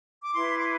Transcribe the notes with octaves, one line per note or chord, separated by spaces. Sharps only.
D6
E4 B4 C6
D6